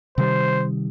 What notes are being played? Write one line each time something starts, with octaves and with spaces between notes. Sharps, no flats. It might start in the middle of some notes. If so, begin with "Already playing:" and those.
C3 D#3 G3 C5